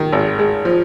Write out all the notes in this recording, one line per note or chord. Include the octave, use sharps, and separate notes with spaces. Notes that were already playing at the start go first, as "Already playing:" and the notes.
Already playing: D#3
G#1
G#3
F3